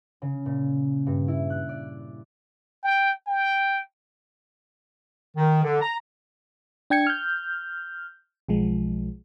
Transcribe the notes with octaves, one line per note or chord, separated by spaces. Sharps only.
C#3
A#2
G2
E4
F#6
D5
G5
G5
D#3
D3
A#5
D4 G5 G#6 C#7
F6 G6
B1 F3 G#3